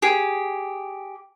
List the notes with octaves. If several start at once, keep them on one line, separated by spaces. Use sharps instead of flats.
G4 G#4